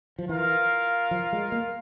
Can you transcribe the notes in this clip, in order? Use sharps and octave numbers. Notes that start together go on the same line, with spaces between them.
F3
E3 F4 A#4 F5
F3
G#3
A#3